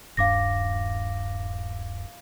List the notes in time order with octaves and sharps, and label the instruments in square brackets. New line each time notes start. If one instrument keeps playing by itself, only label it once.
[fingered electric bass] D#1 G2 D4 [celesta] F5 D6 A#6